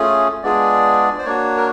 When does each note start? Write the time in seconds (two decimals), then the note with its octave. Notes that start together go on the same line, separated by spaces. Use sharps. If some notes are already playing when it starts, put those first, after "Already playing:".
Already playing: A3 C#4 F4 G#4
0.43 G#3 B3 D4 F4 G#4 D5
1.19 C5
1.25 A#3 D4 F#4 C#5
1.57 A#4